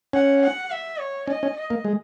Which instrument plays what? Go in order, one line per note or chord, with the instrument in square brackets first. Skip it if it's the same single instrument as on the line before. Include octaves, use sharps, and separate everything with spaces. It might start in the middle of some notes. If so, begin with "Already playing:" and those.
[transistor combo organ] C#4 [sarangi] F#5
[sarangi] F#5
E5
C#5
[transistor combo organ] C#4 [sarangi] D#5
[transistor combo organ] C#4
[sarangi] D#5
[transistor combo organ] A#3
G#3